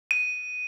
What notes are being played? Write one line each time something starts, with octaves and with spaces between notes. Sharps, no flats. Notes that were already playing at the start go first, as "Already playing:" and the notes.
D#7